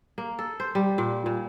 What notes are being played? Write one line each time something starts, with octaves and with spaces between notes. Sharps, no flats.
A#3
A4
C5
G3
A#2
A#2